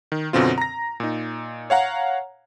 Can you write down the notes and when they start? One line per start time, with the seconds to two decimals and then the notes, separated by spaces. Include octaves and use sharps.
0.12 D#3
0.33 F#2 B2 D3 C4 F4
0.58 A#5 A#6
1.00 A#2 D#4
1.70 C#5 F5 F#5 A#5